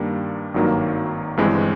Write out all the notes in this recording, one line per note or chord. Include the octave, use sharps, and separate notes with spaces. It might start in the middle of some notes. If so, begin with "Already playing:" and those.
Already playing: G2 D#3 G3 A#3 D4
G#1 G2 D#3 F#3 A#3
G1 G2 E3 G#3 C4